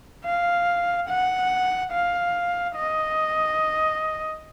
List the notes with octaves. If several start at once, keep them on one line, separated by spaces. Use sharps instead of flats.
F5
F#5
F5
D#5